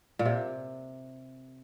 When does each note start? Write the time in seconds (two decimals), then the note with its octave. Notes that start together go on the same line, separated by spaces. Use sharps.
0.19 A#2
0.25 C3